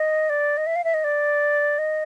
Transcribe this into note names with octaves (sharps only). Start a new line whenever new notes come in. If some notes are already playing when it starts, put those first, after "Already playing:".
Already playing: D#5
D5
D#5
E5
F5
E5
D#5
D5
D#5